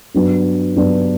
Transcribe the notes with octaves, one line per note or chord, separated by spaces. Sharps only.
G2 F#3 B3 D4
G2 F#3 B3 D4